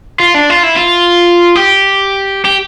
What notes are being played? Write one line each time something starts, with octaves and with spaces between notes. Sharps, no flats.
F4
D4
F4
E4
F4
G4
G4